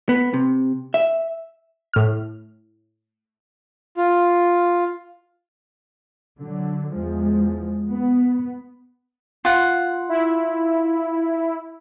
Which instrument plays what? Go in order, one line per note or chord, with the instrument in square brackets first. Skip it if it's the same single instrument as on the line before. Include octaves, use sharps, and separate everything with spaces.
[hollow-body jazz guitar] B3
C3
E5
[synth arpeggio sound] A2 F6
[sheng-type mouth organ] F4
[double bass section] D3 F#3
E2 F3 G#3
B3
[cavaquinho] F4 F#5
[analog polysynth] E4